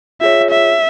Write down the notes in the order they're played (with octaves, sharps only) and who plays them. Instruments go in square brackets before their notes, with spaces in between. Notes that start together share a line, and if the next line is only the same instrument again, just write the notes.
[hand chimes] F4 G#4 C#5 [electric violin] E5
[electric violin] E5